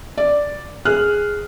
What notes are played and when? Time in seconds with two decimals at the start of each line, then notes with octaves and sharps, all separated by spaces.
0.18 D5
0.85 G#4 F6 F#6